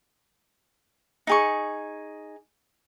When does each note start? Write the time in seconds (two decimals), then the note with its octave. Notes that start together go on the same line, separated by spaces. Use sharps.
1.27 D#4 G#4 C#6